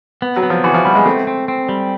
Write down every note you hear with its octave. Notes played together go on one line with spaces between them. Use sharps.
B3
F#3
B3
F3
E3 F#4
F3
G3 B3
G#3
A3 C4
C4
C4
G3